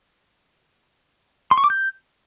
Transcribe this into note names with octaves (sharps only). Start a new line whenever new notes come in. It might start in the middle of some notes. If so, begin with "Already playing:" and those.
C6
C#6
D6
G6